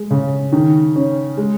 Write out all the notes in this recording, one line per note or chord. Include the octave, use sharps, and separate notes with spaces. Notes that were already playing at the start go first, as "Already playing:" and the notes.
Already playing: G#3
C#3
D#3
C#4
G#3